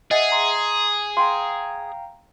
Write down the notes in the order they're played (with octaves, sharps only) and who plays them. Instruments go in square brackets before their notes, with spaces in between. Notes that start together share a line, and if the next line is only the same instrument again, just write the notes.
[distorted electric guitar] G#4 [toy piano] D#5 [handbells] E5 F#5 G#5
[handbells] A#5 C6
[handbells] F5 G5 A#5 [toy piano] C6